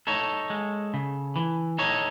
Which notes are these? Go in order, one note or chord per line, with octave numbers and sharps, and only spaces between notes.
D#4 A4 C#5
G#3
C#3
E3
D#4 A4 C#5